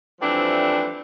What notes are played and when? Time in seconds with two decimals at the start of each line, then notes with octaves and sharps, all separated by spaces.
0.21 E3 F3 G3 A3 C4 D4